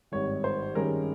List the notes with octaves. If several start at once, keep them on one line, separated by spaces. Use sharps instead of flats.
G#1 G2 D#3 C#5
C5
G2 D#3 G#3 C#4 A#4